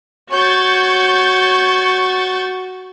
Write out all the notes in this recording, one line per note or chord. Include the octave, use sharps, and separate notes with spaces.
F#4 C#5 C#6 G6 A6